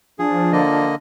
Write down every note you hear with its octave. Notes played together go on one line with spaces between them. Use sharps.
F3 D4 G#4
D3 A#3 D#5